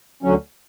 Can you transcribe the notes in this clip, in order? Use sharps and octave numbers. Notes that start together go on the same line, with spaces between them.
D2 D3 F#3 C#4